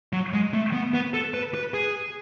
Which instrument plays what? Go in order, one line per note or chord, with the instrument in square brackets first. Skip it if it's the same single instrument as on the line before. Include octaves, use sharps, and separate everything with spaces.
[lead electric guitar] F#3
G#3
A3
B3
B3
A4
B4
B4
G#4